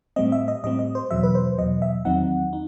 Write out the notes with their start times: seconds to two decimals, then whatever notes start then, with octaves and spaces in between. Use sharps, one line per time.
0.16 A2 G3 C4 D#5
0.32 E5
0.48 D#5
0.64 A2 G3 C4 D#5
0.79 D#5
0.95 C5
1.11 E2 B2 F#3 E5
1.23 B4
1.35 C5
1.58 E2 B2 F#3 D#5
1.82 E5
2.05 E2 D#3 F#3 C4 D#4 F#5
2.53 D#4